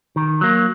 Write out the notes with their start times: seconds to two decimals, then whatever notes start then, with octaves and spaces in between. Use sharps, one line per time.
0.16 D#3
0.41 F#3 A#3